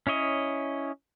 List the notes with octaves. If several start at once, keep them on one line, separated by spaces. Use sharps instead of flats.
C#4 E4 C#5 D#5